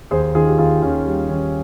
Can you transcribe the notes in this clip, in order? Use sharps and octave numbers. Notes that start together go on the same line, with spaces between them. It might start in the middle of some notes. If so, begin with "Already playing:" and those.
D#2 G#4 C5
D#3 F4 G#4
G4
D#2 F4 G#4
D#2 C#4 F4
G3
D#3 C#4